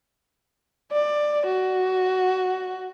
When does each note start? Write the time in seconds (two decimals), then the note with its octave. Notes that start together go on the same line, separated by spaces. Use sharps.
0.93 D5
1.47 F#4